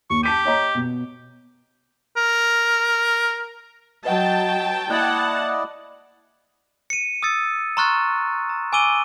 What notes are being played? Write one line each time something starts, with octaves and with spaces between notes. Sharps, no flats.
D#2 C#6
G4 A5 B6 D#7
C#5 D#5 A#5
B2
A#4
F#3 B4 D#5 F#5 G5 A5
A#3 E4 D5 D#5 F#5 A5 F#6 G#6
C#7 D#7
D#6 E6 A6 C#7
A#5 C6 C#6 F6 F#6 A6
A#5
G#5 D6 E6 D#7 G7